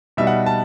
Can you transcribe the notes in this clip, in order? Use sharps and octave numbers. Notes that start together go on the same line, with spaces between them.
B2 G3 D#4 E5
F#5
A5